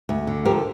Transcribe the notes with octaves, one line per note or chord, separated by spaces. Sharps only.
D2
D3
F3 G4 A#4